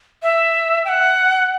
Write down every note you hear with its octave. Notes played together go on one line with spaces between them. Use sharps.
E5
G5
F#5